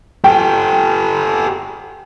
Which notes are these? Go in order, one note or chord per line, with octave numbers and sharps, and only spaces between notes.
G4 A4 G5